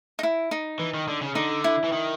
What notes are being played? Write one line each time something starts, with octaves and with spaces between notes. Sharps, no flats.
D#4
E4
D#4
E3
D#3
D3
C#3
D3 D#4
E4
E3
D#3